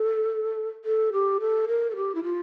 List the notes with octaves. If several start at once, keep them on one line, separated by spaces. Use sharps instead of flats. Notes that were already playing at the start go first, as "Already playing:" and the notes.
Already playing: A4
A4
G4
A4
A#4
A4
G4
E4
F4